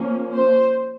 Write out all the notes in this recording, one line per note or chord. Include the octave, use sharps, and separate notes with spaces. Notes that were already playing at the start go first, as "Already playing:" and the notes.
Already playing: F3 A#3 C#4
C5